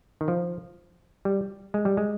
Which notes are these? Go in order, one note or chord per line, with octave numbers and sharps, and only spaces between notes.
D#3
F3
G3
G#3
G3
G#3